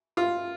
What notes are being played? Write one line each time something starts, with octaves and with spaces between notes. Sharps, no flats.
F4